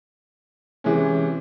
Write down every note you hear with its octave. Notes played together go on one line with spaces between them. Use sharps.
C3 E3 G#3 C#4